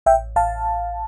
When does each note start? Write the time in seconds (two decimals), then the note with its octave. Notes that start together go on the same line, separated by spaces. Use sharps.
0.06 A1 E5 G5
0.36 A1 F5 A5